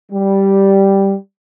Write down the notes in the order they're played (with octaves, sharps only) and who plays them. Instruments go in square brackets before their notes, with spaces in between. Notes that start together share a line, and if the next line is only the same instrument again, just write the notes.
[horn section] G3